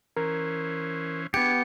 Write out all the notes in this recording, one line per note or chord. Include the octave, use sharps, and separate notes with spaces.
E3 C#4 A#4 C5
B3 D4 G4 G#4 C#7